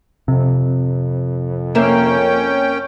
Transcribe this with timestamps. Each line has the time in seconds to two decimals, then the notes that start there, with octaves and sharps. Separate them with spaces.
0.28 F2 C3
1.75 A#3 C#4 A#4 E5 G5